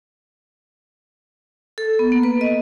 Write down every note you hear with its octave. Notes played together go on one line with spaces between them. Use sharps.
A4
B3
A#3
B4
D#5